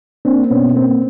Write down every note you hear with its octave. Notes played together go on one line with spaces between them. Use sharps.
A#3 C4 D4
B2 B3 C#4
A#3 C4